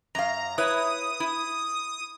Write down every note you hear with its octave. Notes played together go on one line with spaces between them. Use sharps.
F#2 F5 A#5
E4 B4 C#5 D#6
E4